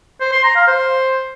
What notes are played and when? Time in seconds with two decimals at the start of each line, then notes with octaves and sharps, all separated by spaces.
0.21 C5
0.32 C6
0.44 A#5
0.56 F5
0.68 C5